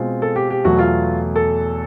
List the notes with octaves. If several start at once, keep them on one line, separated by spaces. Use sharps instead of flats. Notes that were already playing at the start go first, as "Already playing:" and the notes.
Already playing: B2 G#3 C4 F4
A4
G4
G4
E2 B2 F#3 A3 F#4
F4
A4